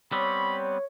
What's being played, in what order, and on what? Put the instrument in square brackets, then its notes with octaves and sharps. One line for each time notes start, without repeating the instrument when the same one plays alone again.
[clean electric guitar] G3 B3 C4 [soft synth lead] C#5 [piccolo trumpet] B5